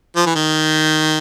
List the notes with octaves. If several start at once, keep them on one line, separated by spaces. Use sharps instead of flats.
F3
E3
D#3